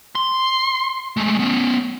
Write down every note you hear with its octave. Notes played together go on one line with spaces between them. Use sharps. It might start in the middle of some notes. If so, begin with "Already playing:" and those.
C6
G#3 A3
B3 C#4